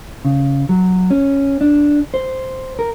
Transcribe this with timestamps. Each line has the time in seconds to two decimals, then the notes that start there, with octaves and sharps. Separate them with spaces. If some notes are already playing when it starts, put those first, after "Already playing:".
0.25 C#3
0.69 F#3
1.10 C#4
1.61 D4
2.14 C5
2.79 A#4